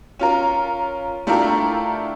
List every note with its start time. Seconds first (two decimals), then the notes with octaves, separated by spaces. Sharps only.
0.19 C#4 F4 A#4
1.27 A3 D4 E4 F4 G4 A#4